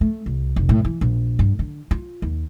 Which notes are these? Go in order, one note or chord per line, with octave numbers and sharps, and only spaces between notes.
A3
C2
F1
A2
E3
A#1
G2
D3
F4
D#2